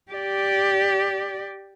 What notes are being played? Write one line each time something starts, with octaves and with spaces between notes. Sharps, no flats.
G4 D5